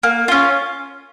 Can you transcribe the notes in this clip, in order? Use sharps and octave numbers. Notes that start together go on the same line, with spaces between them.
A#3
C#4 F4